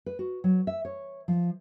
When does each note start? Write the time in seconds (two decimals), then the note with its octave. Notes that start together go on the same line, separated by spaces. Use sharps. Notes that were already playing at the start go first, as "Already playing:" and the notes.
0.06 B4
0.19 F#4
0.44 F#3
0.67 E5
0.85 C#5
1.28 F3